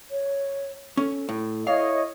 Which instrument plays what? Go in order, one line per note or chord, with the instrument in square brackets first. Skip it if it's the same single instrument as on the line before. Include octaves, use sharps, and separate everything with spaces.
[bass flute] C#5
[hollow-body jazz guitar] C#4 [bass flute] A4
[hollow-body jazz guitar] A2
[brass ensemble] E4 C#5 D#5 [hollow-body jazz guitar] F5